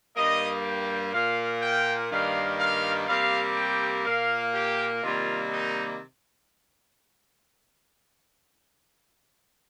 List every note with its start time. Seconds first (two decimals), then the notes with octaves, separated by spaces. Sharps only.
0.16 G2 G3 A#3 D#5
0.64 G5
1.13 A#2 A#3 F5
1.62 G5
2.10 G2 D#3 G3 A#3 F5
2.59 F5
3.07 C3 G3 A#3 F5
3.56 G5
4.05 A#2 A#3 F5
4.53 G4
5.02 C3 D#3 G3 A#3 F4
5.51 D#4